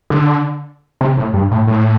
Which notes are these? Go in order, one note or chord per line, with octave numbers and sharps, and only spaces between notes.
D3
C3
A2
G2
A2
A2